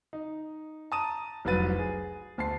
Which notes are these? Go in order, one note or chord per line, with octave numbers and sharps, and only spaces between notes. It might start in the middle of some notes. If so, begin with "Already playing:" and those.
D#4
A5 A#5 D#6 D#7 E7
F1 C2 F#3 B4 A6 D#7
G#4
D2 A5 C7